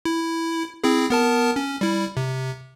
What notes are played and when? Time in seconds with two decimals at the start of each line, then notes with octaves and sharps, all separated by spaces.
0.05 E4
0.84 C4 E4 G#4
1.10 B3 A#4 A5
1.56 C#4
1.81 G3 E4
2.17 C3